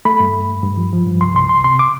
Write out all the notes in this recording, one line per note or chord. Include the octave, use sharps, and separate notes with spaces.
A3 B5
G2
G2
G2
G2
F3
F3
G2
C2 C6
C2 C6
C2 C6
C3 C6
D6